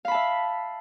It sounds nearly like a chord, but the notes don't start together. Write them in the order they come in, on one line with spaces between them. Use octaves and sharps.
F5 B5 A5 E5